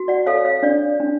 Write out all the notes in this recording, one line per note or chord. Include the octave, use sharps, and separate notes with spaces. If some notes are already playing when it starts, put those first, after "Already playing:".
Already playing: F#4
D5 F#5
A4 C#5 F5
C#5 F5
D4 D5
D4